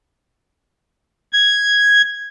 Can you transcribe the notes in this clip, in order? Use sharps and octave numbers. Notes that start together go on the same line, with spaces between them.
G#6